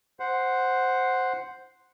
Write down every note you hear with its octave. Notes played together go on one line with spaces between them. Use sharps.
C5 F#5